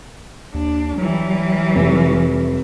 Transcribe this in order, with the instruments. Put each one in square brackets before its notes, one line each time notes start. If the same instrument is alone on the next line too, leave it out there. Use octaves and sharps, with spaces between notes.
[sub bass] D#2 [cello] D4
[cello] E3 G3 [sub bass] F#3
[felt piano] F1